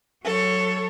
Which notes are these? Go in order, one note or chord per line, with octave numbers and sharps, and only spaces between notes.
F#3 A4 C#5